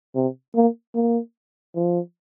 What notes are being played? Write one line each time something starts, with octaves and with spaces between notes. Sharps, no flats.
C3
A#3
A#3
F3